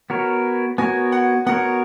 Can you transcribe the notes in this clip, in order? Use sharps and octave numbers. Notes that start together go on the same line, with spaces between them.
B3 F#4 A#4 C#5
B3 F#4 A#4 C#5 G#5
F#5
B3 F#4 A#4 C#5 F#5